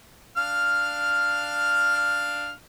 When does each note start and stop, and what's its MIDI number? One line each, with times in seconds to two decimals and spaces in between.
0.37 2.53 62
0.37 2.53 77
0.37 2.53 89